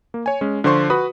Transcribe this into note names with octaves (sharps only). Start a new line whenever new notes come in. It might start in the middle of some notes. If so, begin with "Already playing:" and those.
A#3
C#5 G#5
G#3 C#4
D3 F3 F4 C5 C6 C#6
F#4 B4 B5 D#6